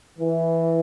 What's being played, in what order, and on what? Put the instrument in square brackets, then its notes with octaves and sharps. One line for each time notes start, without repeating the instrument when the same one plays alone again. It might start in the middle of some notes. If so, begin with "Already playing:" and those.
[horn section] E3